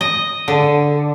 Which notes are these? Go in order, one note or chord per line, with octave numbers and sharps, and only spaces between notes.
D#5
D3